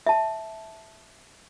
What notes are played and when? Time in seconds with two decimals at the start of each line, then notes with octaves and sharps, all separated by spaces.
0.07 E5 A5